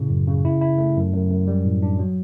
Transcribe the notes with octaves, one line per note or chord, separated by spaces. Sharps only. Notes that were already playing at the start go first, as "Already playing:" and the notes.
Already playing: A2 C#3
F#2
C#3
E4
E4
A3
F#2
F#2
F#2
G3
A2
D4
F#3